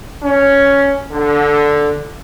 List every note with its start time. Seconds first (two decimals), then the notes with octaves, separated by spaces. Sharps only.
0.23 C#4
1.12 D3